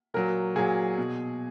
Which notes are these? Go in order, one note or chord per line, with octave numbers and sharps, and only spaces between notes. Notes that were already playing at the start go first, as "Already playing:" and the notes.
A#2 F#3 A#4
A#2 F#3 G#4
B2